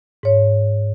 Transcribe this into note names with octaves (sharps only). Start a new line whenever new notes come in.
G#2 C#5